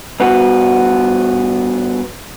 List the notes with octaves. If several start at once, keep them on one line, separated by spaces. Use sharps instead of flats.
G2 B3 F#4